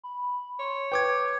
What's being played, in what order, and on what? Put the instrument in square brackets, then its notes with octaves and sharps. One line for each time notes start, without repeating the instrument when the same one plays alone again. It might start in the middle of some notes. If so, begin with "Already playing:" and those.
[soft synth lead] B5
[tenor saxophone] C#5 [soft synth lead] C6
[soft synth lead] B4 [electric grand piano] G5 D6 G#6